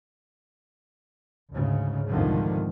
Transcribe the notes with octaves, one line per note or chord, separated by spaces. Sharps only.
D2 G#2 C#3
C2 F2 G#2 D3 D#3 F3